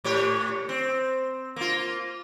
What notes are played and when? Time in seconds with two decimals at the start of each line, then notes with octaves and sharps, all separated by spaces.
0.04 A2 G4 C#5
0.69 C4
1.56 A#3 F4